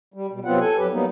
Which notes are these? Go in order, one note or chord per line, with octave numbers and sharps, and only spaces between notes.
G3
B2 G3
C3 F#3 B3 C4 F4 F#5
A4 G#5
F2 F#3 G4 B4
F#3 G3 A#3 B3 D#4